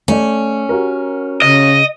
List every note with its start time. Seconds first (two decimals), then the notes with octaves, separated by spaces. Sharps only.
0.08 A3 C#4 D5
0.69 F#4 G4 A#4
1.42 C#3 D#5